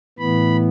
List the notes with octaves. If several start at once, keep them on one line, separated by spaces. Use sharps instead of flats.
A2 E3 B3 B5